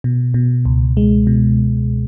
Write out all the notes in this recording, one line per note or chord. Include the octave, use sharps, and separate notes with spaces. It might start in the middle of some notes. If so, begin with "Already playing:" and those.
B2
B2
C#2
G#3
B2